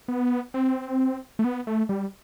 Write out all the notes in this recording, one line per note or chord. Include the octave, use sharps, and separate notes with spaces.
B3
C4
A3
B3
A3
G3